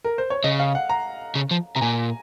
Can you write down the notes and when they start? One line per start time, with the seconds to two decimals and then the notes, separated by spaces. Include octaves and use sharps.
0.04 A#4
0.18 C5
0.30 C#5
0.44 C#3 D#5
0.59 F5
0.75 F#5
0.89 A#5
1.35 C#3
1.51 F3
1.75 C3 A#5
1.81 A#2 G#5